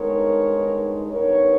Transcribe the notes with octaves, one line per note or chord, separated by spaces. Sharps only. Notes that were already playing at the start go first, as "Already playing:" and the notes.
Already playing: G2 D#3 G#3 B3 D#4 A#4 C#5
G2 G3 B3 D#4 A#4 C#5